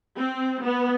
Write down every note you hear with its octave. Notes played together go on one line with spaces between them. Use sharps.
C4
B3